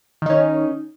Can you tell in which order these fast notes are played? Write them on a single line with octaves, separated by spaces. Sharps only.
D#3 D#4 C#4